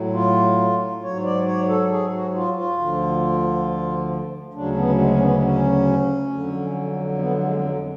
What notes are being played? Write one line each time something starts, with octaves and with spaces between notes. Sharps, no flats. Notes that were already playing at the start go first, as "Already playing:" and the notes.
Already playing: A2 F#3
F4
G#2 F#3 C#5
D5
C#5
A4
G#4
F#4
F4
F4
D2 D3 F3
D2 C#3 F#3 D4
B3
G#3
C#4
B3
C#4
F2 D3 F#3
B3
G#3
F#3